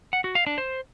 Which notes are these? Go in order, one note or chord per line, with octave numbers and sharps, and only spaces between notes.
F#5
F#4
F5
D4
C5